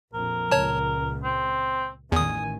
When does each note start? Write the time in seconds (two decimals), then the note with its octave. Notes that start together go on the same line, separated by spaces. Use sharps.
0.14 A#1 F2 A#4
0.51 C#2 A#2 C#5 A5
1.24 C4
2.12 A1 E2 D#3 G#5 D#6